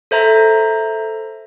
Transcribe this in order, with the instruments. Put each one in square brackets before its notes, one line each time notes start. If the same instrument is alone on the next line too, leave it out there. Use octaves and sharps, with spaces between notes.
[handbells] A4 C5 E5 A#5 G#6